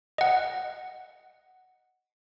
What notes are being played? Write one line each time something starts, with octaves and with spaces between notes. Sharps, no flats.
D#5 F#5